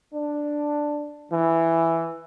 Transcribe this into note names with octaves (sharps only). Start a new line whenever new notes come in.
D4
E3